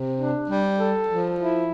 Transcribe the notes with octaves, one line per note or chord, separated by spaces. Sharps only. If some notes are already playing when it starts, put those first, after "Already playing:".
Already playing: C3
D4
G3
A4
F3
E4